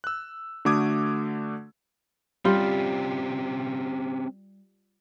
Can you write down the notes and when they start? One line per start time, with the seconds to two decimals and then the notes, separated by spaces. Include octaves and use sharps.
0.04 E6 F#6
0.65 D3 A3 F#4 D6 D#6 G#6
2.45 G3 C4 C#4 F4 G4